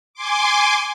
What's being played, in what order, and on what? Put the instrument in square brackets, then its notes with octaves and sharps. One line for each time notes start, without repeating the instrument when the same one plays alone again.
[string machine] G#5 C6 D6